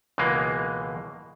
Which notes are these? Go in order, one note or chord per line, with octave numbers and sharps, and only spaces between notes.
C#2 B2 E3 G#3 A#3